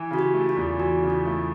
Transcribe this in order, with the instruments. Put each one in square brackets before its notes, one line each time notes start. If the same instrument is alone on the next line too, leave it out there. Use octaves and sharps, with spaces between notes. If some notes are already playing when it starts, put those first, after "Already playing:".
Already playing: [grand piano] E3
[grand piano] C#3 [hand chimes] F#4
[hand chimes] G4
[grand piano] A3
[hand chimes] F4
[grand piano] E2
[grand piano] E3 [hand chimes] F#4
[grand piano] C#3
[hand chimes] F4
[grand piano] A3